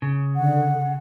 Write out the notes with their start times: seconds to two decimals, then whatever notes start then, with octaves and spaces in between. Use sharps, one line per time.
0.02 C#3
0.36 D3 F#5